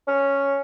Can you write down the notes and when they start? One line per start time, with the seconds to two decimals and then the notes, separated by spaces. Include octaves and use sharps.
0.08 C#4